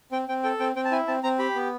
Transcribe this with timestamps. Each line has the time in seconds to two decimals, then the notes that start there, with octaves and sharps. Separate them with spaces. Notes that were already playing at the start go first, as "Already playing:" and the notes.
0.12 C4 G5
0.28 C4 G5
0.43 A4 G5
0.60 C4 G5
0.76 C4 G5
0.85 A5
0.91 E4 G#5
1.08 C4 A5
1.23 C4 A#5
1.39 G4 B5
1.55 B3